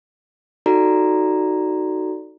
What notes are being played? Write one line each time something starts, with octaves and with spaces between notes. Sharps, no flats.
D#4 F#4 A4 D5 A#5